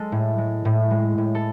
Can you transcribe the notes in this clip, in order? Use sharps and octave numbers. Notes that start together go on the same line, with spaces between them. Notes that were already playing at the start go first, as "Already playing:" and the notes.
Already playing: G#3 A4
A2
G#3
A2
G#3
A2
A4